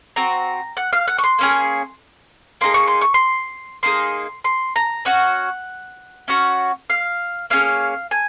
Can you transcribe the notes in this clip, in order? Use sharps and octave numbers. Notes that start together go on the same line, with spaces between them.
C4 F#4 A#5
F#5
F5
F#5
C#6
C6
A#3 C#4 G#4
A#3 D#4 G#4 C6
C#6
C6
C#6
C6
A#3 D#4 G#4 C6
C6
A#5
C#4 F#4 F#5
C#4 F#4
F5
A#3 C#4 G#4 F5
G#5